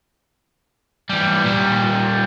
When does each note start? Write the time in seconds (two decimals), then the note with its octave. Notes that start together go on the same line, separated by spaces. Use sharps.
1.09 E3 G3
1.43 A#2 G3